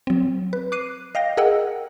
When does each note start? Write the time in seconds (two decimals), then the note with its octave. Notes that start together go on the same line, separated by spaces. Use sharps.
0.07 F#3 C4
0.53 B4
0.72 D6 F#6 C7 D#7
1.15 D#5 F5 G5 A#6
1.37 G#4 A#4 D#5 F#5 G5 E6